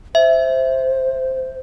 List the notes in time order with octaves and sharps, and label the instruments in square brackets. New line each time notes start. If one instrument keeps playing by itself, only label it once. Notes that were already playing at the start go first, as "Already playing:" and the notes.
[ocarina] C5 [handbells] E5